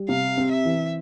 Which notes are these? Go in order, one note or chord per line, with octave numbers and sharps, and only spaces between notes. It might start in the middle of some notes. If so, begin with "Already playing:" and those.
Already playing: G3
C3 F5
C4
E5
E3